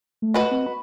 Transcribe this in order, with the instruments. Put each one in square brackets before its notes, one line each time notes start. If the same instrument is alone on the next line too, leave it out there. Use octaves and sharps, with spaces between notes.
[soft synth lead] A3
[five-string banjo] F#4 B4 D#5
[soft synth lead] C4
B5